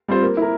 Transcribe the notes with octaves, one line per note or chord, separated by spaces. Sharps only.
G3 C4 F4 C5
A#3
E4 A#4